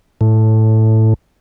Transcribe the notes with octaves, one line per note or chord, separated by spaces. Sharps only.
A2